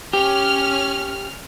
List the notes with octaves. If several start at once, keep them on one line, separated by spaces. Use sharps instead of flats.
C#4 G4 F6